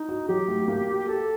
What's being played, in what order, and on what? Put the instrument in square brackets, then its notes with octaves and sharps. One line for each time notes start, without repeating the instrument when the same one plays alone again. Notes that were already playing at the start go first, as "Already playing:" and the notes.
Already playing: [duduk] D#4
[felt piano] F#4
[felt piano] F#3 [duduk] G4
[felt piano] A3
A#3
F#4
[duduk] G4
[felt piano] G4 [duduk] A4